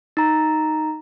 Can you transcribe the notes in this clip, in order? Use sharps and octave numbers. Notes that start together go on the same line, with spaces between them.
D#4 A#5